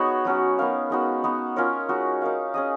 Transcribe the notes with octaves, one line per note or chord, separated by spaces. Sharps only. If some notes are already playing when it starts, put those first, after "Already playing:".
Already playing: B3 D#4 F#4 G#4 C#5
F#3 C#4 F#4
B3 D#4 A#4 F5
G#3 B3 D#4 F#4
B3 D#4 F#4
C#4 F4 A#4 C#5
G#3 D#4 F#4
D#4 A#4 F5
C#4 G#4 D#5